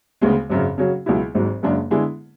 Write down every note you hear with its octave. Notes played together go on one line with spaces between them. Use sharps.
D2 C#3 G#3 B3
G#1 F#2 C#3
C#3 F#3 C#4 F#4
C#2 B2 F#3 B3 E4
G#1 G#2 F#3
F#1 F#2 C#3 G#3 D4
D3 G#3 B3 E4 G#4